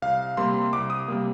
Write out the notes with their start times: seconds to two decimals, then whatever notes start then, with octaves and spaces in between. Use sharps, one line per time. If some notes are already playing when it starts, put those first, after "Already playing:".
0.02 C2 F5
0.37 C3 G3 A#3 C6
0.73 C2 D6
0.90 D#6
1.08 C3 G3 A#3